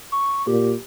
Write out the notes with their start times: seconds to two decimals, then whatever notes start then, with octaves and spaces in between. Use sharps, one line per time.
0.12 C#6
0.47 A#2 G4